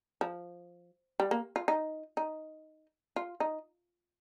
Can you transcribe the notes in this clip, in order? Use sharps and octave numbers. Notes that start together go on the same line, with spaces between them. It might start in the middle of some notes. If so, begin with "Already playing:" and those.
F3
G3
A#3
F4
D#4
D#4
F4
D#4